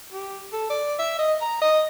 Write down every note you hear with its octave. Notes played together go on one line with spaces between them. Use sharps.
G4
A4
D5
E5
D#5
A#5
D#5